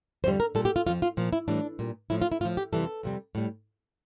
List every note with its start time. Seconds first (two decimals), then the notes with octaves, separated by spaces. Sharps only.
0.24 F2 D3 G3 C5
0.40 A#4
0.55 A#2 G3 A4
0.65 G4
0.76 F4
0.86 F2 D3 F3 F4
1.02 F4
1.17 A#2 F3
1.33 E4
1.48 A2 E3 G3 D4
1.79 A#2 G3
2.10 A2 F3 E4
2.22 F4
2.32 E4
2.41 A2 F3 F4
2.57 G4
2.73 F2 C3 E3 G3 A4
3.03 F2 C3 G3
3.35 A2 G3